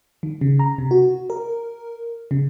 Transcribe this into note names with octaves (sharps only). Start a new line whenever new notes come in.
D#3
C#3
A#5
C3
F#4
A#4
C#3